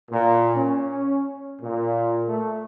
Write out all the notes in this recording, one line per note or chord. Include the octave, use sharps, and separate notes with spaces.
A#2
C#4
A#2
A3